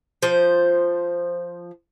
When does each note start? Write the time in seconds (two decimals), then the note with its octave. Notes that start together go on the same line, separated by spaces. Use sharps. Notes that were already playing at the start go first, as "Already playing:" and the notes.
0.23 F3 C5